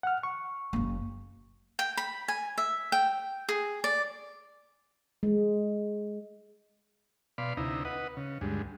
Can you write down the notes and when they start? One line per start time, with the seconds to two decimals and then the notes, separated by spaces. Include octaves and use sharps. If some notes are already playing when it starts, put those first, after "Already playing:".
0.03 F#5 F6
0.23 C#6
0.73 F#1 A#3
1.79 G5
1.97 B5
2.28 G#5
2.58 E5
2.92 G5
3.49 G#4
3.84 D5
5.23 G#3
7.38 B2 D5 F5 B5 C6
7.57 D2 C3 D#4 E4 A#5
7.85 B4 D#5 F#5
8.17 C#3
8.41 D2 G2 G#3